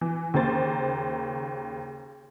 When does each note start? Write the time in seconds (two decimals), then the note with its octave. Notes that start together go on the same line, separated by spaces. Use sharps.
0.01 E3
0.34 D#2 C#3 A#3 C5 A6